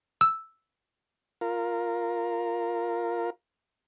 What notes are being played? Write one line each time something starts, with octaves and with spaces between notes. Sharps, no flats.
E6
F4 A#4